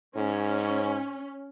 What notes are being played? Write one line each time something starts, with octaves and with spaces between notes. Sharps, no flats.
G#2 C#4